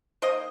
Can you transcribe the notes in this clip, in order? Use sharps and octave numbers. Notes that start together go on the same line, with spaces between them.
D#3 A#3 C5 D#5